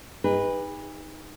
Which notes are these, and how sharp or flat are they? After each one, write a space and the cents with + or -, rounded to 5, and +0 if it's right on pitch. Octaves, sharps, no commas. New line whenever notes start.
D#4 +0 G#4 -45 B4 -5